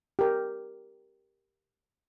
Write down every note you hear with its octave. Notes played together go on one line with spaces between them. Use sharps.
G4 A#4